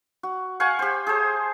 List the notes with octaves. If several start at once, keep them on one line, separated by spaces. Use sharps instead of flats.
F#4
F5 F#5 G#5 C#6
G4 C5
G#4 A4 C5